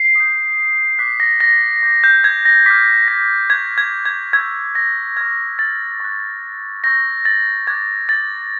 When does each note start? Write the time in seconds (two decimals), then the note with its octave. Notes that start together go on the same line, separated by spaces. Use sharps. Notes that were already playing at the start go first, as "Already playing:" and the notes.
Already playing: C7
0.15 D#6 G6
0.99 D6 F#6 B6
1.20 A#6
1.40 A#6
1.83 D6 G6
2.04 G6
2.24 G#6
2.45 A#6
2.66 D6 F6 B6
3.08 A#6
3.50 C#6 F#6 G#6
3.78 G#6
4.05 G#6
4.33 C#6 E6 G6 G#6
4.75 A#6
5.17 C#6 F6 G#6
5.59 A6
6.00 C#6 F#6
6.84 C#6 E6 G6 A#6
7.25 A6
7.67 D6 F#6 G#6
8.09 A6